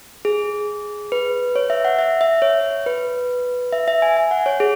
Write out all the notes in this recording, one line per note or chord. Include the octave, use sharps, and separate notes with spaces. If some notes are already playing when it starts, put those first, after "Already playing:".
G#4
B4
C#5
E5
F#5
E5
E5
C#5
B4
E5
E5
G#5
G#5
F#5
C#5
G#4